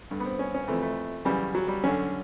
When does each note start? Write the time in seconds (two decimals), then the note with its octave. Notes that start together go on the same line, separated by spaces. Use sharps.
0.11 G2 D3
0.20 B3
0.26 C4
0.39 C#4
0.54 C#4
0.68 F2 C3 E3 A3
0.83 A3
1.25 F#2 C#3 E3 G3
1.55 F#3
1.68 G3
1.84 F#2 D3 C#4